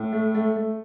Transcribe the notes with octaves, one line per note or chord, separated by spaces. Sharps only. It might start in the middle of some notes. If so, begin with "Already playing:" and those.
Already playing: A2
A3
A3
A3